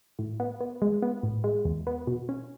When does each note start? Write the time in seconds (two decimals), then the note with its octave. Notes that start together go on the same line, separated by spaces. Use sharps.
0.19 A2
0.40 B3
0.61 B3
0.82 G#3
1.03 B3
1.23 A2
1.44 G#3
1.65 E2
1.87 B3
2.07 B2
2.29 C#4